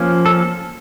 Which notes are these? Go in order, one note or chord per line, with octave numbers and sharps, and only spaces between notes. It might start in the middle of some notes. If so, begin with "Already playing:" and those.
Already playing: F3 A#3 C#4
A4